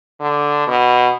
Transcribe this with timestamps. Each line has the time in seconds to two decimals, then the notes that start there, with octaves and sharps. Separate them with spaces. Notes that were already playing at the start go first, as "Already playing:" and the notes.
0.21 D3
0.67 B2